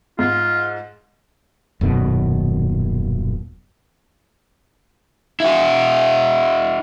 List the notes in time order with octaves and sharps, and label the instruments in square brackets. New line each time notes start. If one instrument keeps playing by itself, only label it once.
[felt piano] G#2 [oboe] F4
[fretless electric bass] D#1 F#2 B2 D#3
[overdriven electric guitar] E4 F#4